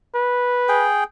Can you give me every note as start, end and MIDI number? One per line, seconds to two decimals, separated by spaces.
0.15 0.89 71
0.69 1.04 68
0.69 1.04 79